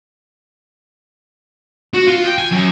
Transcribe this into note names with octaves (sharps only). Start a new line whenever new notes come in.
F#4
F4
G5
G#5
F#2